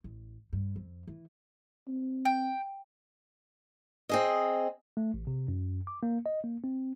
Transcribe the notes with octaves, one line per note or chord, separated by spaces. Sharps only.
A1
G2
F2
E3
C4
G5
C4 G#4 D#5
A3
A1
C3
F#2
D6
A#3
D#5
A#3
C4